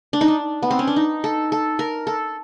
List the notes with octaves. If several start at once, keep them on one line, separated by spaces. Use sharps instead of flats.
D4
D#4
D4
B3
C4
C#4
D4
D#4
A4
A4
A#4
A4